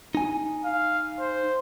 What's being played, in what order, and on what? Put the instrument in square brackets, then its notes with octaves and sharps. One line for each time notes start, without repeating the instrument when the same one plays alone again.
[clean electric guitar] D#4 G#5
[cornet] F5
C5